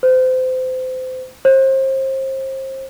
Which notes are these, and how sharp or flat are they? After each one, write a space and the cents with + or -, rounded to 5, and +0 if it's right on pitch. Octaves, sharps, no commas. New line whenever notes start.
C5 -30
C5 +30